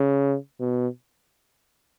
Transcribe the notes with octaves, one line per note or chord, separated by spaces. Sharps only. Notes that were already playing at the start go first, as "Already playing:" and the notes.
Already playing: C#3
B2